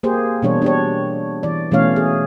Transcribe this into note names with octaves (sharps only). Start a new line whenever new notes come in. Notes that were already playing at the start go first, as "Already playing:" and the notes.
A#3 G4 G#4 C5
B2 E3 G3 D4 G#4 C#5
D4 G4 C#5
E3 D5
B2 E3 A3 C#4 C#5 F5
G#4